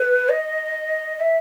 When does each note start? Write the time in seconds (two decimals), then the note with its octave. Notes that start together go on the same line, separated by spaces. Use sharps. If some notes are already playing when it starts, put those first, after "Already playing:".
Already playing: B4
0.29 D#5
1.20 E5